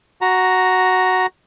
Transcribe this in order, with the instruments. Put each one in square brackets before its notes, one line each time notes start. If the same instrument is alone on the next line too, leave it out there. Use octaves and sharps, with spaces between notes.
[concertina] F#4 A#5